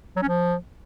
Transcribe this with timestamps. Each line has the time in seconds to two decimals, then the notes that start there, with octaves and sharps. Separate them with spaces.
0.16 F#3
0.22 C#4
0.28 F3